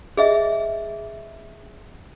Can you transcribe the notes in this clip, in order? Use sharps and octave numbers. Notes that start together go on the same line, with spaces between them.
G#4 D#5 E5